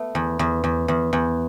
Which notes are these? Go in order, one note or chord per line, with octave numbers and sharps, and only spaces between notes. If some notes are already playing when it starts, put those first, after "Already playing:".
Already playing: A3 B3
E2
E2
E2
E2
E2